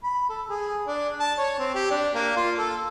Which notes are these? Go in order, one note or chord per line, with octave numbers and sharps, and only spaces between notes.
B5
A4
G#4
D4
A5
C#5
C4
G4
D4
A#3
F4
A4